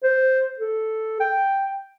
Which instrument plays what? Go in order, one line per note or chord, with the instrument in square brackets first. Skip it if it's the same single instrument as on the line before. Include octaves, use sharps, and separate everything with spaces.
[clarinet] C5
A4
G5